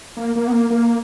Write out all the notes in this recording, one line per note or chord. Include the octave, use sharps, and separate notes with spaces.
A#3
A#3
B3
A#3
A#3